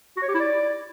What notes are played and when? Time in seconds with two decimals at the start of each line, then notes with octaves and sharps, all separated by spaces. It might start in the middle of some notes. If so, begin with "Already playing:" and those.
0.17 F#4
0.23 C#5
0.28 G4
0.34 E4
0.40 D5